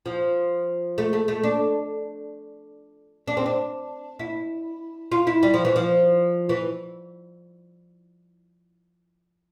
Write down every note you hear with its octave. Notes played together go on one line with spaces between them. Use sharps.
F3
A3
A3
A3
D4
D4
C4
D4
E4
F4
E4
G3
F3
E3
F3
E3